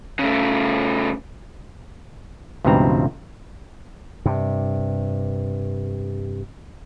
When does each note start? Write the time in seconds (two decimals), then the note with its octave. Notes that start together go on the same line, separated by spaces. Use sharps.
0.19 C#3 A3
2.65 C#2 G2 B2 E3 C4 A#5
4.26 G2 C3